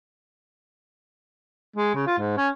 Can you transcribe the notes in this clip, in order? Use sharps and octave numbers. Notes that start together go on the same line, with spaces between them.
G#3
C#3
F4
G#2
C#4